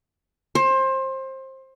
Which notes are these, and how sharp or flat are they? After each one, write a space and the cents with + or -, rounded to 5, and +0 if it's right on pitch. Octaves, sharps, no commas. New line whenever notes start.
C5 +25